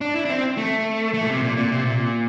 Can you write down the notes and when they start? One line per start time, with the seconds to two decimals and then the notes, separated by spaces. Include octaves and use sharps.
0.01 D4
0.15 E4
0.25 D4
0.30 C4
0.57 A3
1.14 A3
1.22 A#2
1.29 C3
1.43 A#2
1.57 A#2
1.72 C3
1.85 A#2